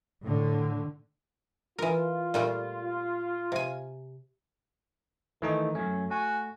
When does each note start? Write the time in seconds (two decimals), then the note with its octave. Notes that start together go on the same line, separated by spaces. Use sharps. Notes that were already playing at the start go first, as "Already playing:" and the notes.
0.23 A2 D3
1.79 E3 F4 A#4
2.34 A#2 G3 A3
3.52 C3 G#5
5.42 D#3 E3 A3 D#4
5.75 F#2 F#3 A3 C#4
6.11 F#4 G#5